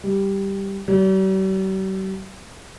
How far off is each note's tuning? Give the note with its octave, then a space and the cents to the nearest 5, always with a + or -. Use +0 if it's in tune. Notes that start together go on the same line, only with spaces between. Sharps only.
G3 +0
G3 -45